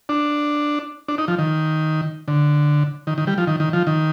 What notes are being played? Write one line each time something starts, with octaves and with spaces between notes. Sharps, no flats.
D4
D4
D#4
F3
D#3
D3
D#3
D#3
G3
F3
D#3
D#3
F3
D#3